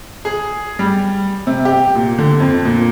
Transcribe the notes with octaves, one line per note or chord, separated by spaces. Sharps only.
G#4
G3
C3
G4
A#2
D3
F2
A#2